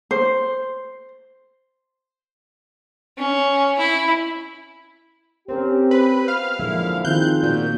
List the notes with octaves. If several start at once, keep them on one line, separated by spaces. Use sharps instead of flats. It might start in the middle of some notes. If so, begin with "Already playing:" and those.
C5
C#4
E4
C4 C#4 G4 A#4 C5
B4
B3 C4 F4 F5
F#2 A#2 D3 F3 G#3 A#3 E4
D#3 F3 C4 D#4 F4 G#4 F#6 G6
A#2 F#4 G6